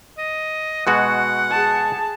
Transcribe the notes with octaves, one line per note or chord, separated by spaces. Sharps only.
D#5
B2 G#3 F#4 F#5
G#4 A5